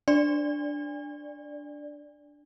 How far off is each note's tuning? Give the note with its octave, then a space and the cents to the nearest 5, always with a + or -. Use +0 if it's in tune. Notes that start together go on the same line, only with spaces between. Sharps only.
D4 +0 D5 +0